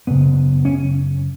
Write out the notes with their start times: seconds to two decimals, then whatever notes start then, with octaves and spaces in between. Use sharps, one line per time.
0.07 F#2 C#3 B3
0.65 C#4